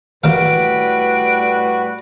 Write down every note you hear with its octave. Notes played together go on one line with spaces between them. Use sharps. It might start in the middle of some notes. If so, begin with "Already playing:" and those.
A1 A2 G3 A#3 F#4 B4 F5 D7